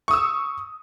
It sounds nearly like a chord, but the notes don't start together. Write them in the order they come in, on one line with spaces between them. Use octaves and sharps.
C#6 D#6 E6